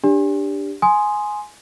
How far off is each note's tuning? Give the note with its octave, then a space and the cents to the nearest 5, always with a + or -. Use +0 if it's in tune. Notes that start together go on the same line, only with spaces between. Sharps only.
D4 +0 G4 +10 D5 -35
G#5 +10 C6 +0 D#6 +0